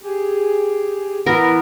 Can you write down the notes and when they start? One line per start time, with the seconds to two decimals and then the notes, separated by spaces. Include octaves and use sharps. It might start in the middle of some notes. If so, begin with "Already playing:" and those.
0.03 G4 G#4
1.26 E3 B3 A#4